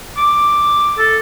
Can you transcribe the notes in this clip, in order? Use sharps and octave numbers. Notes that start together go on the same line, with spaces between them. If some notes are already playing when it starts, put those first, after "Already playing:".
D6
A4